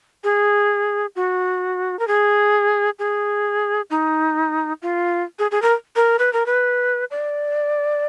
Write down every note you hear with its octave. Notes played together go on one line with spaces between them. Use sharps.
G#4
F#4
A#4
G#4
G#4
D#4
F4
G#4
G#4
A#4
A#4
B4
A#4
B4
D5